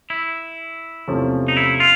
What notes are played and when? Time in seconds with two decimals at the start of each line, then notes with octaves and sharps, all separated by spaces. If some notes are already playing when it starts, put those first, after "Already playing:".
0.10 E4
1.07 E2 C3 F3 A3 C#4
1.48 D#4
1.57 E4
1.80 F4